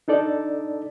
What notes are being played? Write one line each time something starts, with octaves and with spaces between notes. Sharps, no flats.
D4 D#4 A4 D5